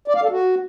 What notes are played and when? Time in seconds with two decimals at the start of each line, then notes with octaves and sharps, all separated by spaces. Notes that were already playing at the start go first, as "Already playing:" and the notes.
0.08 D5
0.15 F5
0.23 A4
0.31 F#4